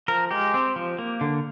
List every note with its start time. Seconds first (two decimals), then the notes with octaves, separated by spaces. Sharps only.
0.08 F3 A#4
0.31 G#3 G4
0.54 C4
0.76 F3
0.99 A#3
1.21 D3